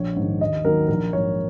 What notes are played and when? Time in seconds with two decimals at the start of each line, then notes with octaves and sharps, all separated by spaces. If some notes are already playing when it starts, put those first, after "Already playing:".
Already playing: A#1 C#5
0.16 G#2 D#3
0.41 D#2 D#5
0.65 D#3 F#3 A#3 A#4
0.88 A#1 A#4
1.13 G#2 F#3 A#3 C#5